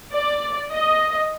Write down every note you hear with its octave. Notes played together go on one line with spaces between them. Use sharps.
D5
D#5